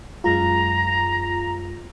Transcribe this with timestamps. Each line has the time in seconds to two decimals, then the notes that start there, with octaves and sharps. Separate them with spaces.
0.24 F#2 G#3 F4 A#5